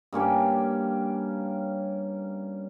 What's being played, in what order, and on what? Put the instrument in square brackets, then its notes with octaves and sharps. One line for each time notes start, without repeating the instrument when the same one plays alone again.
[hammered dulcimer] G2 A#3 C#4 G4